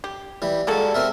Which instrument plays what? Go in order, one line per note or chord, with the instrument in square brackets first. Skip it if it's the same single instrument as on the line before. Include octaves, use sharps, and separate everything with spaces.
[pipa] G4
[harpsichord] E3 G3
[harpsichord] G3 G#3 [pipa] A#3 F#4 A4
[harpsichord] C4 A#4 E5